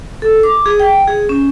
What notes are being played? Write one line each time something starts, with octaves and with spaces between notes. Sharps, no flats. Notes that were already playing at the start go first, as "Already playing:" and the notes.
A4
D6
G#4
G5
G#4
C#4